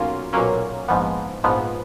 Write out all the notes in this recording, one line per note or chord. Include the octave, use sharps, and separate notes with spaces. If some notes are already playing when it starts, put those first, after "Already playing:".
Already playing: B1 A#2 F#3 A#3 C#4 F4
B1 A#2 F#3 A#3 C#4
A#1 G#2 F3 B3
A#1 G#2 F3 B3